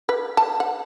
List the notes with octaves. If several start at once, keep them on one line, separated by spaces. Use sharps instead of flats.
B4
A5
F#5